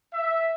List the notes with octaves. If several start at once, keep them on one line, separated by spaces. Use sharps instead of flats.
E5